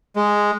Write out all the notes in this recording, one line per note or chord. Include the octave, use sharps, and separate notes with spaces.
G#3